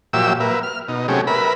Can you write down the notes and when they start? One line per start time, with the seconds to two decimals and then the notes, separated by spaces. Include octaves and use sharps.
0.13 A#2 F3 F#3 G4 E5 E6
0.40 A#3 B4 E5
0.63 F6
0.88 B2 D#4
1.08 C3 F#3 A3 C#4 G4 G#4
1.27 A#4 B4 E5 B5